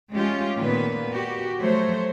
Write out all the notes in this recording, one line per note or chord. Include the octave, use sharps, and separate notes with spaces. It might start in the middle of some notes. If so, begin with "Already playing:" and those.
G#3 A3 C#4 F4 G4
A#2 D#3 B3 B4
F#4 G4
F3 F#3 A3 C5 C#5